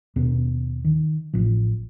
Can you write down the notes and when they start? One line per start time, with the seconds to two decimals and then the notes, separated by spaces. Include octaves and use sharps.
0.16 D#2 B2 B3
0.84 D#3
1.33 A1 A2 F3